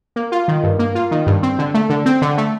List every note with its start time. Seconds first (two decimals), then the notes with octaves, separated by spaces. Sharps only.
0.16 A#3
0.32 F4
0.48 D#3
0.64 G2
0.79 A#3
0.95 F4
1.11 D#3
1.27 G2
1.43 C4
1.59 D3
1.74 A3
1.90 D3
2.06 C4
2.22 D3
2.38 A3